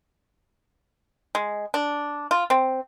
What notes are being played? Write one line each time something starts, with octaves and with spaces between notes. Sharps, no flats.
G#3
D4
F4
C4